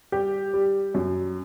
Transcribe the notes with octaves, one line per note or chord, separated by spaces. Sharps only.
G3 G4
G3
F#2